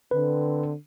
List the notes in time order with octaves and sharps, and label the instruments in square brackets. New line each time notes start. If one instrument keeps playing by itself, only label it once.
[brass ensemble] D3 C4 [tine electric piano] B4